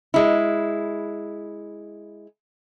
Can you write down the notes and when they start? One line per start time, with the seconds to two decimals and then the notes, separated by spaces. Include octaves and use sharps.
0.14 G#3 E4